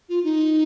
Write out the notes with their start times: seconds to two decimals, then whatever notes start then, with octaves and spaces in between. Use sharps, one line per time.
0.09 F4
0.24 D#4